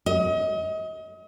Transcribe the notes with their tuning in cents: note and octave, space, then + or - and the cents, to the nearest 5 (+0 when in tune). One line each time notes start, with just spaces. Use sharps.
D#5 +35